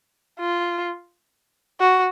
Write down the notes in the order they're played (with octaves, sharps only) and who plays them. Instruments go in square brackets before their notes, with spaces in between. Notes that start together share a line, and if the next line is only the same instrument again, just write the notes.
[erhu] F4
F#4